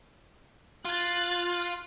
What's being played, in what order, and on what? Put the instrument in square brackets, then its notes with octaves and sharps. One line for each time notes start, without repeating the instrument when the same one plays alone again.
[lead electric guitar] F4 [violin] F#6 A6